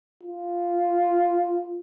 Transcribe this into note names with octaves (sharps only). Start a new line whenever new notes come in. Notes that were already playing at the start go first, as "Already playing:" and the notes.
F4